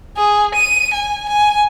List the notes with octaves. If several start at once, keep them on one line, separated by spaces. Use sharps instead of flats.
G#4
D#7
G#5
G#5